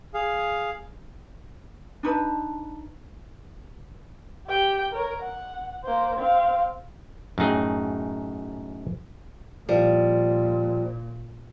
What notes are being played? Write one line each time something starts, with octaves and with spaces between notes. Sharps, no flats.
G#4 F5
D4 D#4 B4 A5
G4 G5
A#4 C#5
F#5
A#3 C5
C4 F5
F#2 A2 D#4 G#4 G5
A#2 F3 G3